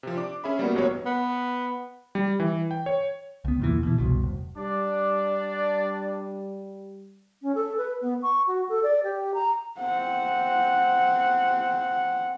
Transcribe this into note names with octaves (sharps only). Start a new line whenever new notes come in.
C3 F3
D4 D6
C#4 G#4 E5 B5
G3 A#3 B3 F#4
A1 G2 F#3 A#3 B3 C#5
B3
G3
E3
G5
C#5
C#2 B3
E2 A#2 E3
B2 E3
F#1 C2 B2
F1
G3 D4 D5
C#4
A4
B4
B3
C#6
F#4
A4
D5
G4
A#5
C4 F#5